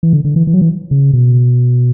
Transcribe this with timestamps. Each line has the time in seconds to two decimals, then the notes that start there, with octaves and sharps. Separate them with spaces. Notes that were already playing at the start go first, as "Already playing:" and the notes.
0.03 E3
0.13 D3
0.25 D3
0.36 E3
0.47 E3
0.54 F#3
0.62 E3
0.91 C#3
1.13 B2